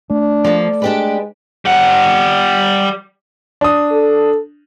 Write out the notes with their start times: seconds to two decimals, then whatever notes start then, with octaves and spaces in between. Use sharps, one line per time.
0.10 A3 D4
0.44 F3 A#3 A4 D5
0.82 G#3 D4 G4 B4
1.65 G3 F#5
3.61 D4 D#6
3.92 A4